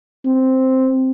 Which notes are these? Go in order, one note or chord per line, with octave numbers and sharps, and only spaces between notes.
C4